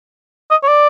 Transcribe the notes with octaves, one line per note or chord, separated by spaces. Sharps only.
D#5
C#5
D5